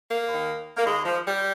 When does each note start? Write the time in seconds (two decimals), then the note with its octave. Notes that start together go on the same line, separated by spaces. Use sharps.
0.09 A#3
0.28 D#2 D#3
0.77 A#3
0.86 D#2 D#3 G#3
1.05 F3
1.25 G3